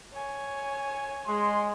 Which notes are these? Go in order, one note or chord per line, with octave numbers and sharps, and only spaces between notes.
C#5 G#5
G#3 C6